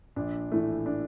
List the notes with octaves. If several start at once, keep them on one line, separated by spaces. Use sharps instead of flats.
A#1 D4
A2 E3 A3
D4